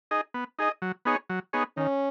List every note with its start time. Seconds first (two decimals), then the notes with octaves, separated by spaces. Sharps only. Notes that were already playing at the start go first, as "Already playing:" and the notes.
0.11 D#4 G#4 D#5
0.34 B3
0.59 D#4 G#4 D#5
0.82 F#3
1.05 B3 D#4 G#4 C#5
1.30 F#3
1.53 B3 D#4 G#4 C#5
1.77 D#3 C#4